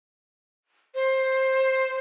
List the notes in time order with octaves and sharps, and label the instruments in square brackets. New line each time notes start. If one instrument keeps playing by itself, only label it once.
[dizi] C5